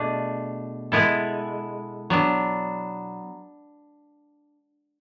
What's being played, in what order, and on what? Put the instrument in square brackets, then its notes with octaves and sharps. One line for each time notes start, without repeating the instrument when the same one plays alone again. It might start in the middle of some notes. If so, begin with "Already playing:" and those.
Already playing: [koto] B2 A3 D4 G#4
G#3 B3 E4 A4
F#3 B3 D4